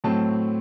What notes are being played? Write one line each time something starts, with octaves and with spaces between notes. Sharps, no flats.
A2 F#3 A3 C4 A5